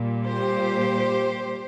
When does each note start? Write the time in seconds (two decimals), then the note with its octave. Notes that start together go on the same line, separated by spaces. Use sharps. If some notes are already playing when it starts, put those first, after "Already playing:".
Already playing: A#2 G3
0.29 G4 C5